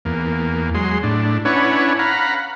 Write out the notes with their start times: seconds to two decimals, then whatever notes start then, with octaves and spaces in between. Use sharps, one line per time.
0.05 E2 A#3
0.75 F#3 G#3 C6
1.03 A2 D4
1.45 C#4 D4 E4 B4 C#5 F#5
1.99 F5 F#5 A#5 B5